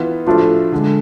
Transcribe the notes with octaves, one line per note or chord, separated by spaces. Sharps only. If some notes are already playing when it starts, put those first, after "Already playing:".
Already playing: E3 B3 F4
A2 F3 A3 D4 F4
D3 G#3 D4